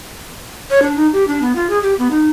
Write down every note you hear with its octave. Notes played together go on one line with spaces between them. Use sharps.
C#5
D4
D#4
G4
D4
B3
F4
G#4
G4
B3
D#4